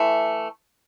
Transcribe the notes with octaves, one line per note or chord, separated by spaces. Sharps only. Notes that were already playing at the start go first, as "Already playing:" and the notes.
Already playing: E3 A3